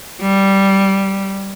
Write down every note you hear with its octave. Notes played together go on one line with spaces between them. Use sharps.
G3